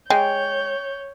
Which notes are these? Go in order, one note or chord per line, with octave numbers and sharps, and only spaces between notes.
G#3 C#5 G5 G6